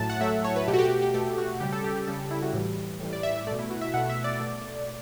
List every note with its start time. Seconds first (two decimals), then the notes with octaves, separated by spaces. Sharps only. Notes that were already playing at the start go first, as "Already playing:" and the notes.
Already playing: A2 F#3 A3 A5
0.09 F#5
0.20 A2 F#3 A3 E5
0.44 C#5
0.56 B4
0.68 B2 G4
0.70 A3 F#4
0.78 G4
0.90 F#4
1.02 G4
1.14 B2 A3 G4
1.38 F#4
1.60 C#3 G3 G4
1.72 A4
1.84 G4
2.07 C#3 G3 A4
2.31 E4
2.42 F#4
2.53 A2 E3 G3
3.00 A2 E3 G3
3.13 D5
3.23 E5
3.36 E5
3.47 A3 D5
3.51 B2
3.59 E4
3.70 F#4
3.81 E5
3.94 B2 A3 F#5
4.09 E5
4.24 D5
4.40 B2 A3